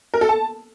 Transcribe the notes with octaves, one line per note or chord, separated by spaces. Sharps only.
A#4
A4
A5